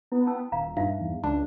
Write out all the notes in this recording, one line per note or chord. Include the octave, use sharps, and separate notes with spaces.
B3 E4
C#4 A5 E6
D#1 F5 A#5
G2 D#4 E5 F5
E2
C#2 D4